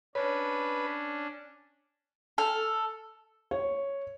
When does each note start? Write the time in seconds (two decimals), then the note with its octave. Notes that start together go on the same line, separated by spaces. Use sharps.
0.15 C#4 D4 B4 C#5
2.38 A4 F6
3.51 C#5